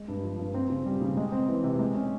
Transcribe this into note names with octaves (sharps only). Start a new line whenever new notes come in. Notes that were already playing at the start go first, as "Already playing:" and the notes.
Already playing: G#3
G2
F3
G2
C4
C#3
G3
C#3
G#3
C4
E3
C3
G#3
C#4